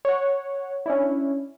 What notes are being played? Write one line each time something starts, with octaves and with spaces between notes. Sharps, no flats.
C#5 F#5
C#4 D4 E4